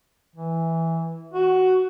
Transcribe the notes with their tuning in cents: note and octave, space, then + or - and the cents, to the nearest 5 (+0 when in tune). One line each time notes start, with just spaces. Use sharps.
E3 -5
F#4 +10